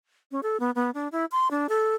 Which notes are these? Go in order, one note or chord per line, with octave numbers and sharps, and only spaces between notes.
C#4
A4
B3
B3
D4
E4
C6
D4
A4